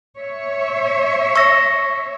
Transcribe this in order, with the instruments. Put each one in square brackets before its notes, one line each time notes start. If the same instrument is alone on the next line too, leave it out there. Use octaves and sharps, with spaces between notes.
[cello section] C#5 E5
[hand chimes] C#6 E6 A#6